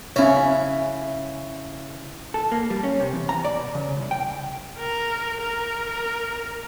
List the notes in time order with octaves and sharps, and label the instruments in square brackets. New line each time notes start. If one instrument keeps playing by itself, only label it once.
[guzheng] C#3 E4 [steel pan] C#4 C#5 [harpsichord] F#4 E5 G#5
[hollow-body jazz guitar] A4
A#3
G3
C#4
C3
E2
A#5
D5
B2
C#3
C2
G5
[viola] A#4
A#4